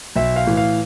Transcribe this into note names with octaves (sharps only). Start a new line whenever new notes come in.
B1 E5
F5
A2 E3
F5